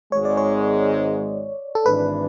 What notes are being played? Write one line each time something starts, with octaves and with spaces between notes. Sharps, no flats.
G#1 G#2 G#3 C#5
D5
C#5
A4
G#1 G#2 E3 G#3 D4 B4